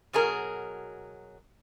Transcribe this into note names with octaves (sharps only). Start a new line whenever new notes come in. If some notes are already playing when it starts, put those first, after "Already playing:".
B2 F#3 G#4 A#4